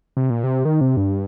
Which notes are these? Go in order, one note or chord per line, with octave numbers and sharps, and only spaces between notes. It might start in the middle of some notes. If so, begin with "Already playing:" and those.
C3
A#2
C3
D#3
C3
G2